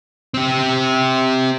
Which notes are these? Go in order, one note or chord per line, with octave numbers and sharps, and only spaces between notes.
C4 G4